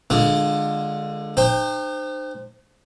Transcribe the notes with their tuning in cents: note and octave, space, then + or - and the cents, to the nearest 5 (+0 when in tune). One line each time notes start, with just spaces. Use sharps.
D3 +20 G#3 +0 F4 +10
D#4 -45 C5 -5 G5 +20